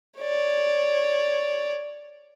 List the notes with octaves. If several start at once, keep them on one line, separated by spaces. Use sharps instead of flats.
C#5 D5